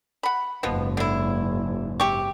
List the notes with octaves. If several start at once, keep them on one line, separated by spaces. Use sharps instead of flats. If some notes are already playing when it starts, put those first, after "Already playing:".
F#5 B5
F#1 G#2 B2 F3 B3
D3 E4
C3 G4 C#6